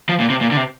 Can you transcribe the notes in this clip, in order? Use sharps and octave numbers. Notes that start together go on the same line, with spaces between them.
F3
A#2
C3
A#2
D3
C3